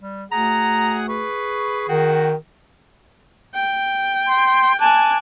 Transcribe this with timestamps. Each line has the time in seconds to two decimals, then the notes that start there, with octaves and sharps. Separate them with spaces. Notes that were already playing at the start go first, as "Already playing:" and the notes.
0.01 G3
0.32 D2 G#4 F#5 A#5
1.08 G#4 B4 C#6
1.89 D#3 F#4 G5
3.55 G5
4.27 C6
4.80 G#5 A5 D6 F#6